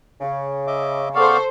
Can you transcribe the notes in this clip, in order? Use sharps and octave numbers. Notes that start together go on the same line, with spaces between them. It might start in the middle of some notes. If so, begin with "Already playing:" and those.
C#3
D#5 E5 D6
B3 A4 C5 D5 F5 C#6